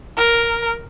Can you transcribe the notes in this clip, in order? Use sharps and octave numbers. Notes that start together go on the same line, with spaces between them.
A#4